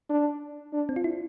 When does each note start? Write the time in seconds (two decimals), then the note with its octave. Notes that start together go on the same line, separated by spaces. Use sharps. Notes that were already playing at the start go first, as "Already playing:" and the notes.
0.09 D4
0.73 D4
0.89 C4
0.96 F4
1.04 E4